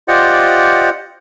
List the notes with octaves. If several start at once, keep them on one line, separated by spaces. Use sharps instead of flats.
F4 G4 C5 D5 D#5 F#5